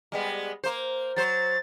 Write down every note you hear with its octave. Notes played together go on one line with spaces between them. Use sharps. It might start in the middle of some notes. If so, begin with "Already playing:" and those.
G3 G#3 B3
A#3 C5
F#3 C5 A6